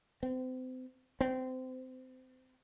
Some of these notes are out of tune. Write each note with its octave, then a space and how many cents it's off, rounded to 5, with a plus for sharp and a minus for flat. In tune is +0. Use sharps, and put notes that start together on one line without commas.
C4 -35
C4 -25